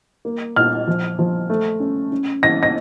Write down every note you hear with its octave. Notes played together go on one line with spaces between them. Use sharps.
A#3
A#2 F6
F3
F3
A3
C#4
C#4
E3 A#6
A#6